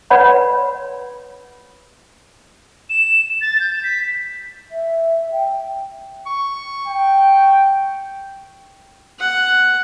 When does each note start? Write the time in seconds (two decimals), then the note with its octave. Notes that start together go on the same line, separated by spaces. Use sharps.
0.10 B4 C#5 D5 F#5 B5 C6
2.90 E7
3.41 A6
3.60 G6
3.83 B6
4.71 E5
5.32 G5
6.27 C#6
6.87 G5
9.19 F#5